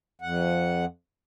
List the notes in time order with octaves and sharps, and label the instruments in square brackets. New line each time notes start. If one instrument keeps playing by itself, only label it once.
[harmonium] F2 F#5